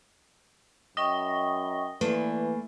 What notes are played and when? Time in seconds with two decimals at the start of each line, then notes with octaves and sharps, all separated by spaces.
0.97 F#2 D#5 G5 C#6 D#6 A#6 G7
2.01 E3 A3 A#3 B4 D5